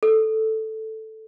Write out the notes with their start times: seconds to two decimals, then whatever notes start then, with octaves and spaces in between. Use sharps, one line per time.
0.03 A4